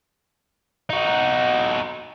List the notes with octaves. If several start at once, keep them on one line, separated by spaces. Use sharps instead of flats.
D#4 F#4